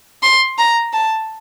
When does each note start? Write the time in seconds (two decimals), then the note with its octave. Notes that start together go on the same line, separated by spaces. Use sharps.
0.23 C6
0.58 A#5
0.93 A5